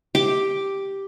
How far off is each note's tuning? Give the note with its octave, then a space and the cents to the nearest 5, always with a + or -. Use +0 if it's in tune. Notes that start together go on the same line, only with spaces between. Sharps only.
G4 +0 D6 +0